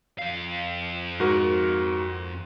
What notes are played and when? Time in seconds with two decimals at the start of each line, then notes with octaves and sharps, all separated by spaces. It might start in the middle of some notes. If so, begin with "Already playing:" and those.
0.18 F2 F5
1.20 G#2 F#4 A#4